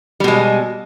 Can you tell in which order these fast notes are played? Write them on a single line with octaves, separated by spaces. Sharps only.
G3 B2 G#3